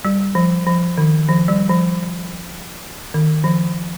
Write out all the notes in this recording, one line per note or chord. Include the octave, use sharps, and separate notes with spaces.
G3
F3
F3
D#3
F3
G3
F3
D#3
F3